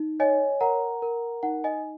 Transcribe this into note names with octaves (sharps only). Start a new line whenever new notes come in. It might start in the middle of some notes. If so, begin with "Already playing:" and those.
Already playing: D#4
C#5 D#5 G#5
A#4 F#5 A#5
A#4
D#4 F#5
D#5 G#5